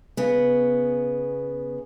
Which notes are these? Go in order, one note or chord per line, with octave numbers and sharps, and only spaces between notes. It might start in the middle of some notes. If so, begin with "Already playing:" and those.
C#3 B3